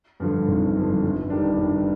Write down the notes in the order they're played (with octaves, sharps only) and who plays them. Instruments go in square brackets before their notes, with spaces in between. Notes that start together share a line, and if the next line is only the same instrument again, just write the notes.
[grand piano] G2 D3 F3
G#1
G2 D3 F3
G1
G2 D#3 G3 D4
G1